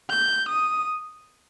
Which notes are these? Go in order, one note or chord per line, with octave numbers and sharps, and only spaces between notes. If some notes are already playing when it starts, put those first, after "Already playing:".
G6
D#6